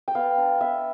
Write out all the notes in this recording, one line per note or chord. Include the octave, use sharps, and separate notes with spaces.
G5
B3 F5
D4
B3 E5